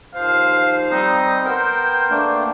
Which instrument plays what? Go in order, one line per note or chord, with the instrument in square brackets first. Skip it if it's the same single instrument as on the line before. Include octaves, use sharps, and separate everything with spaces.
[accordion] D#2 F3 C5 [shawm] F5
[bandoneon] G3 C4 D#6 [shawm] D#4
[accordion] B3 G5 [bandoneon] A#4 [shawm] C5
[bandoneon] A3 A#3 D4